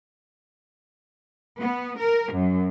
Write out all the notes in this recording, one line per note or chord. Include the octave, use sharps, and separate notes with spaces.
B3
A#4
F#2